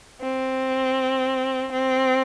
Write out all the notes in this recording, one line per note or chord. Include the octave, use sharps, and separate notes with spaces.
C4
C4